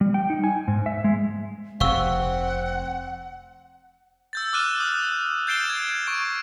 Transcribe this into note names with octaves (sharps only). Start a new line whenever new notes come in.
G3
G5
D#4
G#5
G#2
E5
G#3
F1 C3 C4 F5 F#5 C#6 E6
E6 G6 A6
D6 F6 F#6 D#7 E7
D#6
G6 A6 C7 D7 E7 G7
G#6
C#6 D7